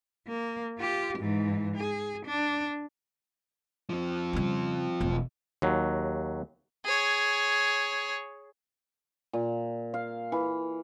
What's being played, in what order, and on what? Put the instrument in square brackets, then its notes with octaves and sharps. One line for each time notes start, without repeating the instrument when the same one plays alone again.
[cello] A#3
F4 G4
G#2 E3
G#4
D4
[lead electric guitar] F3 C4
[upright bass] C#3 G3
E1 A3
[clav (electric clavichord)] D#2 F#3
[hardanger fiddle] G#4 C#5
[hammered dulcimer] A#2
F5
E3